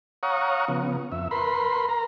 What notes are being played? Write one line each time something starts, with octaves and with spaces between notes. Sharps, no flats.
C#5 F5 F#5 A#5 C#6 D#6
C#3 F3 B3
F2 E5
A#4 B4 B5 C6
A#4 A#5